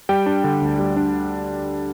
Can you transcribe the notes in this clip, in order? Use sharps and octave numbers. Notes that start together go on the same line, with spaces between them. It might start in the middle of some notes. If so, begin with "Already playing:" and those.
G3 G5
D4
D3
D2
G3
D4